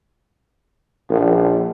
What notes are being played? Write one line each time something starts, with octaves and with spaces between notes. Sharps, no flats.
A#1